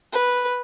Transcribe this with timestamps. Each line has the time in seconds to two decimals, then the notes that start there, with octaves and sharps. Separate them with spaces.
0.13 B4